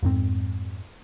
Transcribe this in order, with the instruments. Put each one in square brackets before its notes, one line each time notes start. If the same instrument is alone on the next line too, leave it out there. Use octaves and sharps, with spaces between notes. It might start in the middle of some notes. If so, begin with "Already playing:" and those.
[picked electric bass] F2 G#2 C4